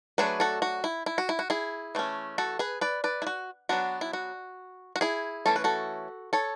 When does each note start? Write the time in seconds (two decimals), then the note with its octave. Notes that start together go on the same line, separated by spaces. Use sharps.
0.18 F#3 A3 D4 G#4 B4
0.40 F#4 A4
0.62 F#4
0.84 E4
1.06 E4
1.18 F#4
1.29 E4
1.39 F#4
1.50 E4 G#4
1.95 E3 A3 C#4
2.38 F#4 A4
2.59 G#4 B4
2.81 B4 D5
3.04 B4 D5
3.22 E4
3.27 F#4
3.69 F#3 B3 D4 F#4
4.01 E4
4.13 F#4
4.96 F#4
5.01 E4 G#4
5.46 E3 A3 C#4 A4
5.56 B4
5.64 F#4 A4
6.33 A4 C#5